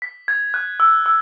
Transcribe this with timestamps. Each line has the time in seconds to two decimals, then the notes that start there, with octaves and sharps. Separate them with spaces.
0.02 B6
0.28 G#6
0.54 F#6
0.80 E6
1.06 E6